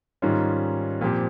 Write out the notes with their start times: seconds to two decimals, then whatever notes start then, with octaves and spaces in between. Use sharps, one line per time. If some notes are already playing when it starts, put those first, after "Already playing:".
0.22 G#2 D#3 G3 C#4 F4
1.01 A#2 F3 C4 G4